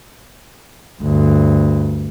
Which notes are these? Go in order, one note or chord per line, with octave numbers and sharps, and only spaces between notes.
D2 G2